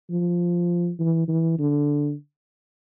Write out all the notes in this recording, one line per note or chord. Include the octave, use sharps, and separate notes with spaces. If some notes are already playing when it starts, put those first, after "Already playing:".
F3
E3
E3
D3